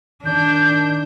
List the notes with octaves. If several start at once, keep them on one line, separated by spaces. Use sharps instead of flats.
D#3 D4 G6